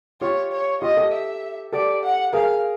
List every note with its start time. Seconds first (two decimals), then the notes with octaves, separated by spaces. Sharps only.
0.21 F4 G4 C#5
0.52 C#5
0.82 F4 G4 D#5
0.97 G4 A4
1.13 E5
1.73 G4 A4 D5
2.04 F#5
2.33 G#4 A#4 F5